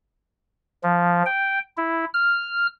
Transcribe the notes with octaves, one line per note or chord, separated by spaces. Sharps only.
F3
G5
E4
F6